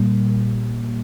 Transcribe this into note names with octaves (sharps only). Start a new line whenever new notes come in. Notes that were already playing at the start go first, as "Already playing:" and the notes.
Already playing: A#2 G3 A#3